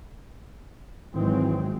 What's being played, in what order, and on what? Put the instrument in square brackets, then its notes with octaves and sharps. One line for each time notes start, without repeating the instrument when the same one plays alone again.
[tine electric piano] G#1 [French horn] E3 [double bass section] F#3 G#3 C4